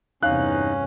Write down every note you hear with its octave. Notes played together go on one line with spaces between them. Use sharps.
E2 G2 C3 C#4 D#4 F5 F#6